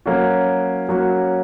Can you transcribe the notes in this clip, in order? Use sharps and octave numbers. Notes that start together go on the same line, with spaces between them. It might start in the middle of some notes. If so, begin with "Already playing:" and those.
F#3 A#3 C#4 F#4
F#3 A#3 C#4 F#4